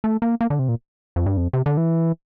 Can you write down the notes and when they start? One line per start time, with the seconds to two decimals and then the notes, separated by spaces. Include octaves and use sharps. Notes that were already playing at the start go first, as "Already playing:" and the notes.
0.04 A3
0.22 A#3
0.41 A#3
0.50 D3
0.59 C3
0.69 A#2
1.16 F2
1.26 G2
1.37 F2
1.53 C3
1.66 D3
1.77 E3